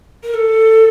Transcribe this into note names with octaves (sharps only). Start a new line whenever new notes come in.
A#4
A4